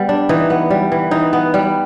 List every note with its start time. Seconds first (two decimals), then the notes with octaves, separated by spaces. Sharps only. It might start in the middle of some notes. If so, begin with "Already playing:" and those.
Already playing: G3 B3
0.09 D4
0.29 E3 D#4
0.50 B3
0.70 G3
0.92 E3
1.11 E3 D#4
1.33 B3
1.54 G3